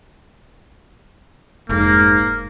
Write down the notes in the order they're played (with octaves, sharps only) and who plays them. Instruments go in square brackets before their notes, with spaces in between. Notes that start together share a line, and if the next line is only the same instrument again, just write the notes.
[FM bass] F1 [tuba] G#2 [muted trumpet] A#3